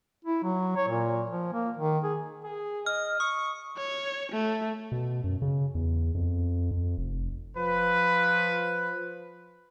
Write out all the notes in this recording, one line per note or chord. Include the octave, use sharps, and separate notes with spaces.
E4
F#3
C#5
A#2
F3
A#3
D#3
G#4
G#4
D#5 F6
C#6 D#6
C#5
A3
B2
F#2
C#3
E2
F2
F2
F1
F3 B4